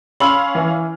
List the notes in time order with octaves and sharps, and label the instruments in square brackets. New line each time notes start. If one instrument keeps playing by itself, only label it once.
[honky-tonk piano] C#4 F5 F6 [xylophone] B5 C6 E6 [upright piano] F#7
[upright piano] E3